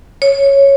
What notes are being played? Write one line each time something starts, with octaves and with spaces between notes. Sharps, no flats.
C#5